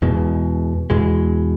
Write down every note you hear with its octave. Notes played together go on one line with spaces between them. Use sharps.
E2 B2 G#3
E2 B2 G#3